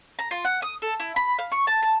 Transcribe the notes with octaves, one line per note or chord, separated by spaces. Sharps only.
A#5
F4
F#5
D#6
A4
E4
B5
F5
C#6
A5
A5